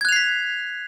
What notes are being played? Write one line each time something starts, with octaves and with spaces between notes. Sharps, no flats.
F#6 G#6 B6 C7 F7